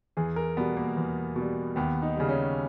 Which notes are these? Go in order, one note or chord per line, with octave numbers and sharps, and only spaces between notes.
E2 G#4
A#4
B2 G3 B3
A#3
E2
B2 G3
D#2 B3
D#4
C#3 G3
C#4